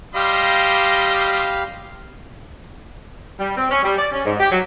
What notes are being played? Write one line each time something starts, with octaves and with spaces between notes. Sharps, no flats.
G3 G4 D#5 F5 B5 C6
G3
C4
C#4
G3
D5
C#4
G#2
G4
F#3